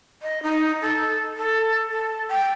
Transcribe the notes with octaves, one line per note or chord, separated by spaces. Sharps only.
D#5
D#4
A4
A4
A4
G5